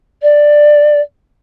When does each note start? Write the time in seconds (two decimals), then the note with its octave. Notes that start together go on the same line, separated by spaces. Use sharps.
0.22 D5